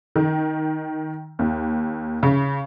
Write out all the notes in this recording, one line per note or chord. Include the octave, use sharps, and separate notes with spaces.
D#3
D#2
C#3